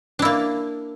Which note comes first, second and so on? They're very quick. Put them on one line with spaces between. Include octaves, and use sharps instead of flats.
D4 E4 A#3